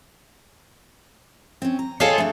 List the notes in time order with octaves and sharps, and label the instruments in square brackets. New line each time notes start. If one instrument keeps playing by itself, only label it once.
[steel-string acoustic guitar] C4 C#4
A#5
[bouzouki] F4 G#4 A4 [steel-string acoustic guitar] C#5 D#5 G5
[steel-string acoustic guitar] A3 D4